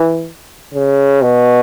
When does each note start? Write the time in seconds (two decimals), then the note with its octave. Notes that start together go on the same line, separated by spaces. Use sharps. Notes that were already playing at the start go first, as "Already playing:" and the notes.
Already playing: E3
0.74 C#3
1.23 B2